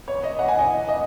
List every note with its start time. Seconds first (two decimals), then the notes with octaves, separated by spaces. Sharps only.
0.08 C#5
0.23 D#5
0.39 F#5
0.48 G#5
0.59 D#5
0.89 D#5